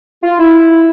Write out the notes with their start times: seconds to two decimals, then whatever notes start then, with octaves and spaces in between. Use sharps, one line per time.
0.23 F4
0.39 E4